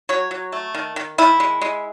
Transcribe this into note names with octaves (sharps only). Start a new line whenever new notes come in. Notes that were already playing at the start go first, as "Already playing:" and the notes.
F#3 C#5
F#3
A3
D#3
D#3
D#3 E4
G#3
G#3